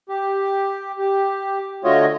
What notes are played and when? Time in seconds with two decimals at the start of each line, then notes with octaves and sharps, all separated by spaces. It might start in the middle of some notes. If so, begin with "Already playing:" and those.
0.09 G4
0.99 G4
1.84 D3 A3 F4 F#4 C#5 D#5